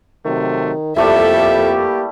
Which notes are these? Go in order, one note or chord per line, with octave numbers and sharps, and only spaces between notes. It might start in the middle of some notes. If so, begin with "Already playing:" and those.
C3 D#3 F#3 A3
F2 G3 A3 A#3 E4 G4 A4 E5